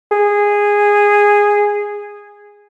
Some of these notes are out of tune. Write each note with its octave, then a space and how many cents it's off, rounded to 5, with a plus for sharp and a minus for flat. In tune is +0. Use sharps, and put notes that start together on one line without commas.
G#4 -10